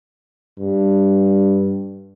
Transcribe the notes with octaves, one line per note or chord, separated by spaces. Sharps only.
G2